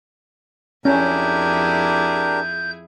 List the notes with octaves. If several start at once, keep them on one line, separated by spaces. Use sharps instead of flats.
F2 C#4 D4 E4 G4 G#4 A#4 G6